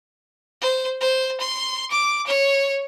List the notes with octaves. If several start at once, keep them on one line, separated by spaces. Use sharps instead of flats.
C5
C5
C6
D6
C#5